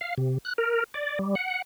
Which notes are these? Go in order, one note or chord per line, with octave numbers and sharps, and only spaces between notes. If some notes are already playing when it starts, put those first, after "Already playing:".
F5
C3
F#6
A#4
D5
G3
F#5